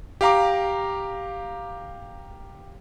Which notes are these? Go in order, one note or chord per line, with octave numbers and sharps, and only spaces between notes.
G4 F5 A#5 D6